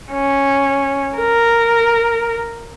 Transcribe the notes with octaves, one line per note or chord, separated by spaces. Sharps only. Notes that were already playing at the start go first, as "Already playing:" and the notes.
C#4
A#4